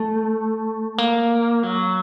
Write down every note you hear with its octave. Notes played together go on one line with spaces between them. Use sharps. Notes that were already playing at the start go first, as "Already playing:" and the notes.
Already playing: A3
A#3
F#3